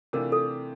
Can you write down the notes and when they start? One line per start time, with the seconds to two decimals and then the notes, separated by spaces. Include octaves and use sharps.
0.13 C3 E3 A3 D4 F4 A#4
0.32 A4